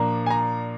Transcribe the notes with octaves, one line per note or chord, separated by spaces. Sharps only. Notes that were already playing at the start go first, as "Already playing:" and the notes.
Already playing: A#2 F3 A#3 D4 A#5
G#5
A#5